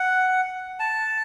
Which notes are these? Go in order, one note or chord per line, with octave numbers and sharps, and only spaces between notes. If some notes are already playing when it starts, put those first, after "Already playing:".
Already playing: F#5
A5